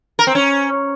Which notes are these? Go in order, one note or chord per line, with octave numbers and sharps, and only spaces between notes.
A#4
C4
C#4